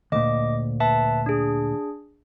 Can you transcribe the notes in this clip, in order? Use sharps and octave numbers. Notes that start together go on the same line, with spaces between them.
D2 A#2 D#5 D6
B4 E5 A5
D4 G#4